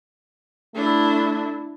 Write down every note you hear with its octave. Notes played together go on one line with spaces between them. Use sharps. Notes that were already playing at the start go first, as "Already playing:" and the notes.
A3 D4 E4